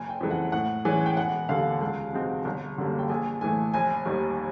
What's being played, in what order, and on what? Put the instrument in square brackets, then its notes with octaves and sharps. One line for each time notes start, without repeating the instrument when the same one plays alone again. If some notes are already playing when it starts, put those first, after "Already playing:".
Already playing: [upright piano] F#1 G#5
G5
F2 C#3 E3 G#3
F#5
A2 F#5
E3 G#3 C#4 G#5
G5
E1 F#5
D#2 D3 F5
C#2
B2 G#3 C4 D#4
G1
F#2 D3 G3 A#3
G5
A#1 G#5
A2 E3 A3 G#5
F1 G#5
D#2 D#3 G3